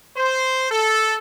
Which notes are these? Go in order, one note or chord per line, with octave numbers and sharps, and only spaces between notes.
C5
A4